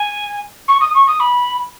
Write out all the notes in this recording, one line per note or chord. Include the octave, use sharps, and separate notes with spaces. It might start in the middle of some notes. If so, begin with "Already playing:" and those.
Already playing: G#5
C#6
D#6
C#6
D#6
B5